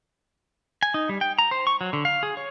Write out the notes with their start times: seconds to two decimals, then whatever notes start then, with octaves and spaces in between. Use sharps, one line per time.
0.83 G#5
0.94 D#4
1.09 G3
1.21 G5
1.39 A#5
1.51 C5
1.67 C#6
1.81 F#3
1.93 D3
2.05 F5
2.23 G#4
2.37 C#5